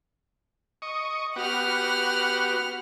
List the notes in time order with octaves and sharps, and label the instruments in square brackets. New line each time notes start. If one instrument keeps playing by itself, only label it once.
[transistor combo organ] D#5 C#6
[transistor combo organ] B3 F#4 G4 [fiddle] F#5 F6